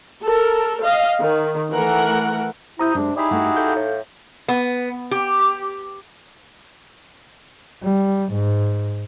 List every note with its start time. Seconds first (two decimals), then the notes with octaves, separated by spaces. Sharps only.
0.22 A4 A#4
0.81 D#5 F5
1.21 D#3
1.72 E3 A3 A#4 F#5
2.79 C3 E4 A#5 D#6 G6
2.95 F#2 G#3 D4
3.16 D#4 E4 G4 G#4 D5 B5
3.31 G2 A3 F#4
3.56 A4 F5 G6
3.76 A2
4.48 B3
5.11 G4
7.83 G3
8.33 G#2